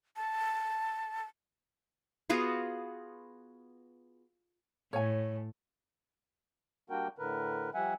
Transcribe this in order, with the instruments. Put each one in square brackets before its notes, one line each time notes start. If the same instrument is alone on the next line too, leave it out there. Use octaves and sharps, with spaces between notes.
[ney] A5
[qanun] B3 F4 F#4 G#4
[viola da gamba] A2 [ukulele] C#5 G#5
[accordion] G3 A#3 D4 F#4 A#4 G5
A2 D3 A#4 B4
F3 G3 E5 F#5 G#5